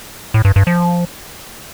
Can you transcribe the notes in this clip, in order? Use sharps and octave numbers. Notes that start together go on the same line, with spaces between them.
A2
G2
G2
F3